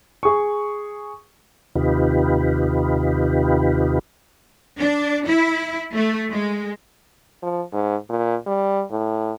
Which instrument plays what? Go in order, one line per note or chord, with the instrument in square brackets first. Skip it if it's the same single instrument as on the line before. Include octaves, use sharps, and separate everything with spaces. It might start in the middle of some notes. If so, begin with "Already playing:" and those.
[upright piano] G#4 C#6
[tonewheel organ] D#2 C3 D#4 F4 G4 B4
[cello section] D4
E4
A3
G#3
[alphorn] F3
G#2
A#2
G3
A2